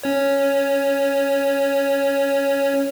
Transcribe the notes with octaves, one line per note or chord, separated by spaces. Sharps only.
C#4 C#5